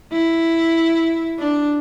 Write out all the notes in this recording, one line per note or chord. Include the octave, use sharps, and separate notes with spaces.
E4
D4